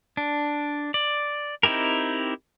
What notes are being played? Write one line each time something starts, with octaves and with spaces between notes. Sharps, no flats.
D4
D5
C4 D#4 E4 G4 A#4